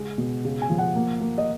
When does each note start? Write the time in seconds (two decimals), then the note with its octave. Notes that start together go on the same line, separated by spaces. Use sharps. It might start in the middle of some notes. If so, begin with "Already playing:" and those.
Already playing: C#3 G#3 F#5
0.18 B2
0.45 C#3
0.62 G#5
0.70 F3
0.79 F#5
0.95 A#3
1.21 A#3
1.38 D#5